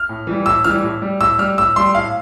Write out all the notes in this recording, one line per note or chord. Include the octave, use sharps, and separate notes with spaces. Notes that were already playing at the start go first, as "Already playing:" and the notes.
Already playing: F6
A2
E3 G3
A2 E6
E3 G3 F6
A2
G3
A2 E6
G3 F6
A2 E6
G3 C6
A2 F5